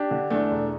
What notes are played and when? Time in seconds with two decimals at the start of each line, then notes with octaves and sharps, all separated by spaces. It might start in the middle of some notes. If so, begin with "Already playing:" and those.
Already playing: D4 G4
0.11 D3
0.30 E2 A3 D4
0.51 E1